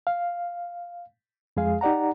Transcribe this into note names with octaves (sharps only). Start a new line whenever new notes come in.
F5
F2 G#3 G#4 F5
D#4 G4 D5 F#5 A#5